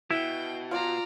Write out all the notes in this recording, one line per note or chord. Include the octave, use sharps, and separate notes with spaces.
B2 E4 G5
F4 D5 A#5